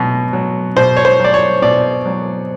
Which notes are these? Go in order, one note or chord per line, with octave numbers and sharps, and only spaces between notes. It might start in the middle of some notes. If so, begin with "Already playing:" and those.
Already playing: B2 F#3
F#3
B2 C5
C#5
C5
F#3 D5
C#5
B2 D5
F#3